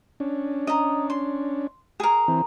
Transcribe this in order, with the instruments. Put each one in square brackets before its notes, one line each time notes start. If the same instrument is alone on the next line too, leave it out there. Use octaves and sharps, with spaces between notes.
[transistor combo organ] C#4 D4
[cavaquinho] D#5 A#5
C6
G#4 A#4
[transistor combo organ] E3 C4